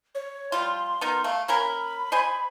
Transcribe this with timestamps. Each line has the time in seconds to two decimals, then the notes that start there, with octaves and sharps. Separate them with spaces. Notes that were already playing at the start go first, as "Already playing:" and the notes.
0.15 C#5
0.52 F3 G3 F4 C6
1.01 B3 D#4 A#4
1.24 A3 F5
1.48 A#3 C#4 A#4 B5
2.12 C5 D#5 G#5